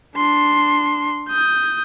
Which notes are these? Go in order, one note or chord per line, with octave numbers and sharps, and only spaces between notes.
D4 C6
D#6 G6